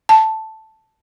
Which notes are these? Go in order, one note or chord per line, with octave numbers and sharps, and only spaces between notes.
A5